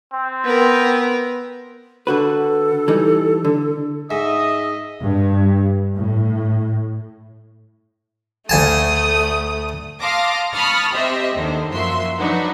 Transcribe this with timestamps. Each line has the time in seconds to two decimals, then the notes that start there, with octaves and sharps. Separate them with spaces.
0.13 C4
0.44 B3 A#4
2.07 D3 F#4 A4 B4
2.88 E3 G3 D#4
3.45 D3
4.11 G#2 D#5 E5 D#6
5.00 G2
5.96 A2
8.49 D2 A3 G#5 A5 D#6
10.01 F5 A5 C6 D6 D#6 A#6
10.53 A5 B5 C#6 D#6 F6 A6
10.93 C4 G4 C5 D#5 E5
11.36 D#2 D3 D#3 C5
11.70 F#2 A#2 F3 F#4 E5 C6
12.18 F3 F#3 D4 D#4 F#4 B4